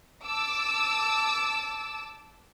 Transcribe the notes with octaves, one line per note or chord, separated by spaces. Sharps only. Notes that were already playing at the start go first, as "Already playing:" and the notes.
A5 D6 E6